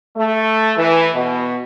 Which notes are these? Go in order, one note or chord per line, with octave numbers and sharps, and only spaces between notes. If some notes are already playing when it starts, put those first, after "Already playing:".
A3
E3
B2